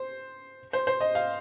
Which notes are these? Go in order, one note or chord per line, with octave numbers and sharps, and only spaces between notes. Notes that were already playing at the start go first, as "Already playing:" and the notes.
Already playing: C5
C5
C5
D#5
F5